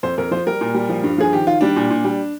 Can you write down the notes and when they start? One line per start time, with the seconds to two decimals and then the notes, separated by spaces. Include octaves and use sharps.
0.03 F2 C5
0.18 F2 A#4
0.31 F3 C5
0.47 G3 A#4
0.61 A#2
0.74 G3
0.89 F3
1.04 G2
1.18 F3 G#4
1.33 D#3 G4
1.47 D#3 F4
1.61 G3 D4
1.76 A#2
1.90 A#2
2.05 G3